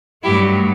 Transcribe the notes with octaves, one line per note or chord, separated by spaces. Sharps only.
G2 F#3 A3 E4 G4